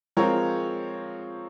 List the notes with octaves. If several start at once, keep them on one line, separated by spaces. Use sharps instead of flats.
F3 G#3 C4 F4 A#4 C#5